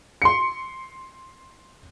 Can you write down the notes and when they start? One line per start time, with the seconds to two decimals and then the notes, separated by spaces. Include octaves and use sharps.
0.22 C6 C#7